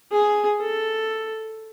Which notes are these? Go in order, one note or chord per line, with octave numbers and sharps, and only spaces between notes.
G#4
A4